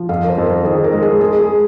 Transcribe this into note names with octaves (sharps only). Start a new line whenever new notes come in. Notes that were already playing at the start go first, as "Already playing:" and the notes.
Already playing: F3
F2 F5
A#4
C5
F2
A#4
D#3 G#4
A#4
G#3
G#4
G#3 G#4
G#4